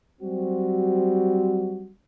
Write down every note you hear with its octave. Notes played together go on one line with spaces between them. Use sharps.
F#3 G3 C4 F#4